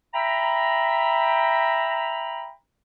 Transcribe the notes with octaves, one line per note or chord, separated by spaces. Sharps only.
E5 G5 A#5 B5